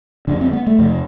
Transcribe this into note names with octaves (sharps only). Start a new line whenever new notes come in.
F2 D3 D4
C4
B3
A3
F2 C3